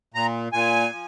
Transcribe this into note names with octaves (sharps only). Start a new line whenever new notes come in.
A#2 A#5
A#2 G#5
F3